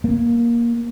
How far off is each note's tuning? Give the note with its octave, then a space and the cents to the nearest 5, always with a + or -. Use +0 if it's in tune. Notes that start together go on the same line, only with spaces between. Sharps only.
A#3 +15